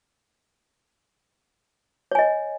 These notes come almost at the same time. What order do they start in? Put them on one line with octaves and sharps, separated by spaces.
C#5 G#5 D#5